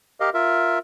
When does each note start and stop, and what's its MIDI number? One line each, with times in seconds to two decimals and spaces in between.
0.20 0.30 67
0.20 0.30 70
0.20 0.30 75
0.20 0.30 77
0.34 0.79 65
0.34 0.79 70
0.34 0.79 76